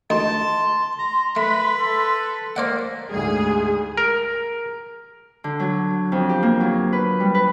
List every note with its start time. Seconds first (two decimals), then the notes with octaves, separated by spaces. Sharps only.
0.10 D2 D#4 A5 C6
0.99 A#5
1.36 A3 B4 B5
1.78 A4
2.56 A#3 C5 D5 F#5
3.11 D2 G#2 G3 G#4
3.97 A#4
5.44 D3
5.60 F#3
6.12 F2
6.29 G4
6.43 A#3
6.60 F#3
6.93 B4
7.20 G3
7.35 B4